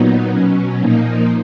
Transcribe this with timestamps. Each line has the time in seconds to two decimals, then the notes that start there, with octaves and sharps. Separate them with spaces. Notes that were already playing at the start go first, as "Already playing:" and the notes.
Already playing: A#2 F#3 B3 D#4
0.30 B2 F#3 C#4
0.80 A#2 F3 A#3 D#4